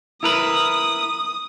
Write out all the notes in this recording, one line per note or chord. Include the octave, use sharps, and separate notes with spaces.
E4 A#4 B4 D#6